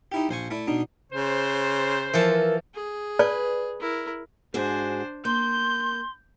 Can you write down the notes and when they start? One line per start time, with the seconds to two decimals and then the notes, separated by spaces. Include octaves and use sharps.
0.12 D#4 E4 G4
0.29 A#1 C5 G#5 C#6
0.51 A3 E4 D5
0.68 B2 D4 D#4
1.13 C#3 C5
2.13 E3 F3 A4 A#4
2.75 G#4
3.19 B4 D5
3.80 E4 A#4
4.54 G#2 D4 F#4 G#4 C5
5.25 A#3 C6 G6